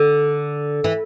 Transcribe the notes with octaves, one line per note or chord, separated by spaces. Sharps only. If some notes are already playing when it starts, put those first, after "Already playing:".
Already playing: D3
E3